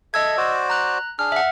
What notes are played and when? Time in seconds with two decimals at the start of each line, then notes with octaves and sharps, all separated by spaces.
0.14 A4 D#5 E5 E6 G#6
0.37 F#4 C5 D5
0.70 A#5 F#6
1.19 D4 G#4 F6
1.32 E5 F#5